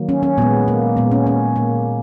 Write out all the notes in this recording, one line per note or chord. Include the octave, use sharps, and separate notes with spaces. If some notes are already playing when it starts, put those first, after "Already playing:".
Already playing: D#3 F#3 A#3
C#4
C#4
A#2 G#3 B3
A#3
A#2 G#3 B3
C#4
C#4
A#2 A#3